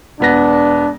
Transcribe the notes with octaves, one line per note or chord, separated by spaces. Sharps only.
E1 B3 D4 A#6